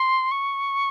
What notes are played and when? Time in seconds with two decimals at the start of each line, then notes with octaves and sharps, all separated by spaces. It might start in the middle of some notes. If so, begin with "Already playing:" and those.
Already playing: C6
0.31 C#6